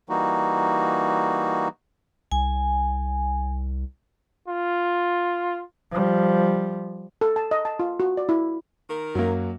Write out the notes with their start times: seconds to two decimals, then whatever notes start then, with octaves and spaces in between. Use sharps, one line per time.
0.09 E3 G3 A#3 D#4 F#4
2.32 C2 G#5
4.48 F4
5.91 F3 G3
7.21 A4
7.36 A5
7.51 D#5
7.65 A5
7.79 F4
8.00 F#4
8.17 D5
8.29 E4
8.89 D#3 A#4
9.15 F#2 F#3 A#3